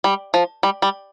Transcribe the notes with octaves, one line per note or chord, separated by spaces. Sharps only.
G3
F3
G3
G3